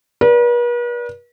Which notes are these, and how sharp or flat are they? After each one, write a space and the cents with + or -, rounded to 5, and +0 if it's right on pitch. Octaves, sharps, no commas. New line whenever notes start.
B4 -45 D5 -15